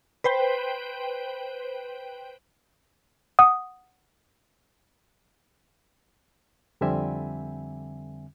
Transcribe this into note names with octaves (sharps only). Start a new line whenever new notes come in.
B4 C5 G5
F#5 D#6
F2 D3 G3 C4 E5 G#5